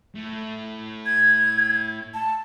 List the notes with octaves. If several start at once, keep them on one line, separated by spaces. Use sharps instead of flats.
A2
G#6
A5